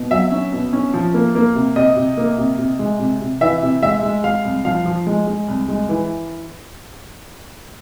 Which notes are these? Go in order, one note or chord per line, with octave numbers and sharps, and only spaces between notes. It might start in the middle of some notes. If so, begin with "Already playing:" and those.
Already playing: B2
F#3 E5
C#4
B2
C#4
F3
A#3
A#3
C3
C3 D#5
C3
A#3
C3
C3
G#3
C3
C3
E3 E5
C3
G#3 E5
G#3
G#3 F5
C2
F3 F5
F3
G#3
G#3
C2
G#3
E3